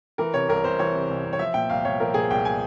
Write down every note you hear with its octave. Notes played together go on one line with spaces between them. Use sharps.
E3 A#4
C3 C#5
C2 A#4
C2 C5
E3 C#5
C3
C2
C2
C#5
F3 E5
A#2 G5
C2 F5
C2 C#5
F3 A#4
A#2 G#4
C2 G5
G#5